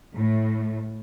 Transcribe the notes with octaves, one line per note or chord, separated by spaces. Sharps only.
A2